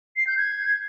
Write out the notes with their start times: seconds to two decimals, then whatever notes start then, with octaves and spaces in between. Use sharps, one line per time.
0.16 C7
0.27 G6
0.38 G#6